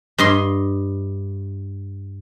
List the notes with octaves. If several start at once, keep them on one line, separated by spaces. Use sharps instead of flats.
G2 D#5 C6